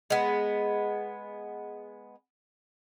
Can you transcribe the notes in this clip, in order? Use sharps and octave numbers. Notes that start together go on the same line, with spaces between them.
G#3 B3